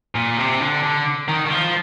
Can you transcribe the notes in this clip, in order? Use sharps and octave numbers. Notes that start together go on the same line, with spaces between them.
A#2
C3
D3
D3
D#3
D#3
F3